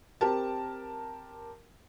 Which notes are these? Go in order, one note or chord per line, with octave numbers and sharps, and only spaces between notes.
C4 G4 A#4 A5